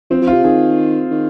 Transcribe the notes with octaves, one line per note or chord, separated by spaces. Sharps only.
F3 C4
F3
F4
C3
D#3 G#4
D#3